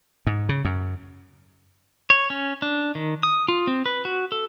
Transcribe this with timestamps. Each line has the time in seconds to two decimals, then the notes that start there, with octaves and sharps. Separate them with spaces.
0.27 G#2
0.49 C#3
0.65 F#2
2.10 C#5
2.30 C#4
2.62 D4
2.95 D#3
3.23 D#6
3.48 F4
3.67 C4
3.86 B4
4.05 F#4
4.32 A4